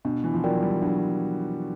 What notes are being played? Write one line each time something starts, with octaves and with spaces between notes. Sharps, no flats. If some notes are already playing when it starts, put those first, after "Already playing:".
B2 D4
E3
F3
F#3 F4 A#4 D5 G5
G3
F#3 D4